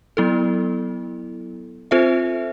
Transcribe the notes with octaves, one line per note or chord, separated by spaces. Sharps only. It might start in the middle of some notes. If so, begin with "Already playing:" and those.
F#3 B3 E4 A4
C4 F4 A4 C5 E5